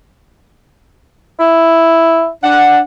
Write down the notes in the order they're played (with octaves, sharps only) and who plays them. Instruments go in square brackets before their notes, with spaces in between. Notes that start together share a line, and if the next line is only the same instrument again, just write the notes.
[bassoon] E4
[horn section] D4 F#5